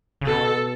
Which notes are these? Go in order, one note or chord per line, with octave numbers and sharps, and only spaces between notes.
C#3
B2 A4